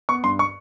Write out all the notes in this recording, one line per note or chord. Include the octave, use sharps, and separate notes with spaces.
B3 C#6
G2 C6
C#6